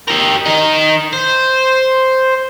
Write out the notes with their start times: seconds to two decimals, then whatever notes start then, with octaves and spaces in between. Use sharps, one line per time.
0.08 G4 A#4
0.46 D#4 A#4
1.13 C5